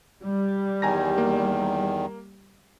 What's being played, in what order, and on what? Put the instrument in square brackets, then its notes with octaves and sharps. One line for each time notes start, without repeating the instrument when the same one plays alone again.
[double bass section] G3
[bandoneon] E2 D#3 [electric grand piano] G#5 A#5 A#6
[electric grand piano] A#3